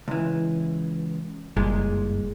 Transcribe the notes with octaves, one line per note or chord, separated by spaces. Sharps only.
C#2 E3
F#1 G2 A#2 G#3